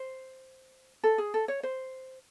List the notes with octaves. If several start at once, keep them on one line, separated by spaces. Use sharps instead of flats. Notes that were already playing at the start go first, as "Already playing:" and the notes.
Already playing: C5
A4
G#4
A4
C#5
C5